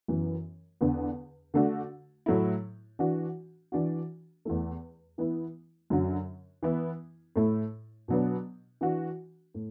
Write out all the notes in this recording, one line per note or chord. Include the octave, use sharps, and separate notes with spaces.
F#2 E3 B3
E2 D3 B3
D3 A3 D4 F#4
A2 F#3 A3 E4
E3 D4 F#4
E3 D4 F#4
E2 E3 A3
E3 B3 E4
F#2 D3 F#3
E3 B3 E4
A2 A3 E4
B2 F#3 B3 D4
E3 D4 F#4
A2